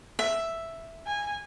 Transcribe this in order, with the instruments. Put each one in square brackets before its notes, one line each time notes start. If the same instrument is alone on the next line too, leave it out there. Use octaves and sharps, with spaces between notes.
[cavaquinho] E5
[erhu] G#5